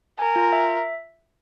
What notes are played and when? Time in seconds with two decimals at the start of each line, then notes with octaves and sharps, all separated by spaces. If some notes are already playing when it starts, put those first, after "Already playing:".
0.19 A#4 G#5
0.36 F4
0.53 E5